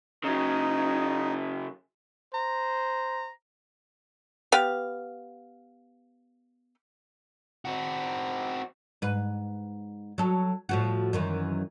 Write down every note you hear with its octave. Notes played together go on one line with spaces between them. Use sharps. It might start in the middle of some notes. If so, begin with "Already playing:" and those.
C#3 F#3 D#4
C5 A#5
B3 G4 F5
C4 F#4
G#2 B4
F#3 A4
A2 F3 F#4
F#2 D#3 E3